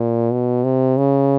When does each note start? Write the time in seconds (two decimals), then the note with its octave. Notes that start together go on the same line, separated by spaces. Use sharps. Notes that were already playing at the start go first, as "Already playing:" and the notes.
Already playing: A#2
0.31 B2
0.64 C3
0.97 C#3